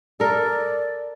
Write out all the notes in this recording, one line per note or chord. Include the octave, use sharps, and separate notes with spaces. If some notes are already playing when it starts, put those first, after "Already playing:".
A4 A#4 D5